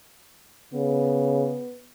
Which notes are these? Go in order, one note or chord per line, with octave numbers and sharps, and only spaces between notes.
C#3 B3